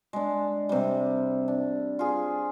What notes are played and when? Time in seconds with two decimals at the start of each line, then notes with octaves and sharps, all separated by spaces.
0.13 G#3 D4
0.69 C3 G3
1.48 D4
1.99 F4 G#4